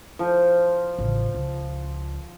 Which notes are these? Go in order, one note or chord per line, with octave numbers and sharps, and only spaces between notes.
F3
A1 C#3
C#2